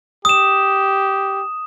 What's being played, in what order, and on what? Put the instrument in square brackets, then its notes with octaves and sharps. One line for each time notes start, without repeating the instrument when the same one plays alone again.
[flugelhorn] G4 [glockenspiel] D#6 E7